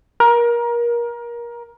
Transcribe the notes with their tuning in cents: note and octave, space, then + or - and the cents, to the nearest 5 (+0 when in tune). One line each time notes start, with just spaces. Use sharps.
A#4 +20